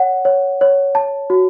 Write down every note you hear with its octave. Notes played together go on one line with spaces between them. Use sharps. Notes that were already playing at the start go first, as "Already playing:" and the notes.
Already playing: C#5 F#5
C#5
C#5
A5
F#4